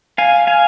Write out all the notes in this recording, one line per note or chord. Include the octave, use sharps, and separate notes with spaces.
F5 G#5
F5 G#5